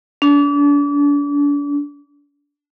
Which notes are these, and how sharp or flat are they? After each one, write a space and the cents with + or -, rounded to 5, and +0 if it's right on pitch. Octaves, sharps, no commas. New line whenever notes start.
D4 -35